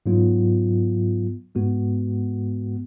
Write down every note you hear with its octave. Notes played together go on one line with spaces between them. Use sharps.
G#2 F#3 B3 F4
G#2 G#3 B3 F#4